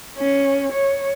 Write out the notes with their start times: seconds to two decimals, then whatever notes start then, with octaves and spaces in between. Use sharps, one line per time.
0.18 C#4
0.73 C#5